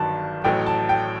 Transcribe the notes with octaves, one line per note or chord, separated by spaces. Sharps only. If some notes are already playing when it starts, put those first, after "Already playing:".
Already playing: G1 G2 D#3 F#3 A5
A1 A2 F#3 G5
A5
G5